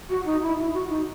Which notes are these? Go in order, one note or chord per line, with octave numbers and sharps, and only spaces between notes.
F#4
D#4
E4
E4
F#4
D#4